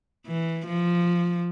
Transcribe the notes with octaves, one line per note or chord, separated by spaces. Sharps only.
E3
F3